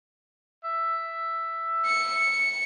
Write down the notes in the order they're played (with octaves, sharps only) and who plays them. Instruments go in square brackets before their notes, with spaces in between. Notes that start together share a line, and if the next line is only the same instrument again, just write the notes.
[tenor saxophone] E5
[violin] C#7